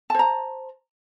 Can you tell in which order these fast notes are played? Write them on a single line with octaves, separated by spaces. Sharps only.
A5 C5 A#5